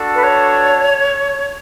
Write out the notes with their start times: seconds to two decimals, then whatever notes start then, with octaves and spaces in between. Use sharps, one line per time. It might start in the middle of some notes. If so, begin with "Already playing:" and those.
Already playing: D4 F#4 A4
0.15 B4
0.23 C#5